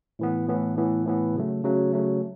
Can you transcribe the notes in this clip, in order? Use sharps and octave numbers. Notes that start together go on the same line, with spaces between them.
A2 E3 B3
A2 E3 B3
A2 E3 B3
A2 E3 B3
C#3 F#3 A3
C#3 F#3 A3
C#3 F#3 A3